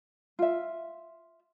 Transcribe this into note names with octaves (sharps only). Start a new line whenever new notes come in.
F4 E5